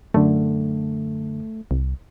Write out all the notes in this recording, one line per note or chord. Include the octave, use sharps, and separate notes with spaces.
F#2 D3 A3
C2